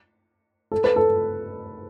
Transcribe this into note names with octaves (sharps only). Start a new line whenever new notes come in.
A4
B4
A4